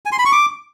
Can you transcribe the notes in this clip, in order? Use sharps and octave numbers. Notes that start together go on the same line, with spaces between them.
G#5
C6
B5
C#6
D6